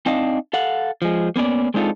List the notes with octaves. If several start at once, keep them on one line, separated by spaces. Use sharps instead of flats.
C4 D4 D#4 D#5 F5
A4 F5 F#5
F3 G#3
A#3 B3 C#4 D5
G#3 C4 D4 D#4 F4 A4